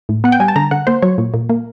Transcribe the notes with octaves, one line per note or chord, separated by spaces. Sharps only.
A2
B3 F#5
G5
G3 G#5
A5
D3 A#5
D3 F#5
A#3 C5
F#3 C#5
A#2
A#2
A#3